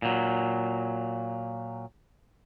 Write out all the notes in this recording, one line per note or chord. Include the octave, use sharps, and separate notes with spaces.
A#2 F#3